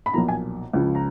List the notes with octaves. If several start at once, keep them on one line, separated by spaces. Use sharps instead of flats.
B5
B1 A#2 F3 A#5
G#5
C#2 C#3 F3
A#5